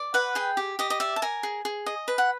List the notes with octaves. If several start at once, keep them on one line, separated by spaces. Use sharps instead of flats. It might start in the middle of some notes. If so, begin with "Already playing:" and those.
Already playing: D5
B4 F#5
G#4 G5
G4
G4 D#5
D#5
D5 E5
A5
A#4 G#5
G#4
G#4
D#5
B4
F#5